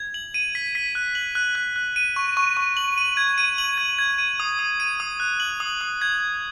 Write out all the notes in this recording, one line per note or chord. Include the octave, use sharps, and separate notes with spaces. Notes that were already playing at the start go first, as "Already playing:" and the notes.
Already playing: G#6
F#7
D#7
B6
B6
F#6
F#7
F#6
F#6
F#6
D#7
C#6
C#6
C#6
F#7
D#7
G#6
D#7
F#7
G#6
G#6
D#7
D#6
D#6
D#7
D#6
F#6
F#7
D#6
D#6
G#6
G#6